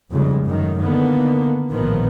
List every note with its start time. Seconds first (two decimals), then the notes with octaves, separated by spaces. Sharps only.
0.11 F1 F2 C#3 G3 G#3
0.44 F#2 A2 D#3
0.79 D3 D#3 A#3 B3
1.70 A#1 A2 D#3 F3 B3